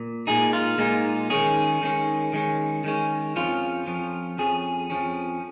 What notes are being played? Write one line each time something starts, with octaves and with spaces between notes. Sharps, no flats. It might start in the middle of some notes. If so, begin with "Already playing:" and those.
Already playing: A#2
A#2 G#3 D#4 G#4
F4
A#2 G#3 D#4
D#3 G#3 C#4 G#4
D#3 G#3 C#4
D#3 G#3 C#4
D#3 G#3 C#4
F2 F3 C#4 F4
F2 F3 C#4
F2 F3 C#4 G#4
F2 F3 C#4